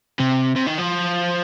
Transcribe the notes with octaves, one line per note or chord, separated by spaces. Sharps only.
C3
C3
D#3
F3